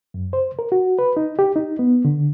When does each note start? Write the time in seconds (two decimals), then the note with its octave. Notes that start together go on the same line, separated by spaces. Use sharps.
0.14 F#2
0.33 C5
0.59 A#4
0.72 F#4
0.99 B4
1.17 D#4
1.39 G4
1.56 D#4
1.79 B3
2.05 D3